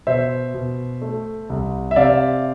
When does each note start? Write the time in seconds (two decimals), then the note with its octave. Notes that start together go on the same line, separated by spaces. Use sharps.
0.07 B2 C5 E5
0.54 B2
1.02 A3
1.50 C2
1.91 E5
1.96 C3 D5 F5